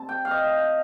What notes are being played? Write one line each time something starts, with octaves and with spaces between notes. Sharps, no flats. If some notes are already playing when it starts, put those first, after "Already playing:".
Already playing: C3 C4 A5
G5
F5
D#5